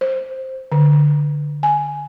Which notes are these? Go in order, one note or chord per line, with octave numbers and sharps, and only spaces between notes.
C5
D3
G#5